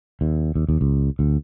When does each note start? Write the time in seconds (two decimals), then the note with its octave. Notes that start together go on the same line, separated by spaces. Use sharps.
0.21 D#2
0.55 D#2
0.69 D#2
0.81 C#2
1.19 D2